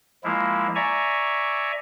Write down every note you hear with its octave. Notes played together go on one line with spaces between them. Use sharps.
F3 G#3 A#3 E4
D5 E5 G#5 A#5 C#6